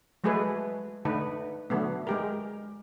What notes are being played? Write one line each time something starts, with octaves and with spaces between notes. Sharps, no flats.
F#3 G#3 A3 G#4 A4 B4
D3 A3 D#4 B4
D3 F#3 A3 B3
G#3 G4 A#4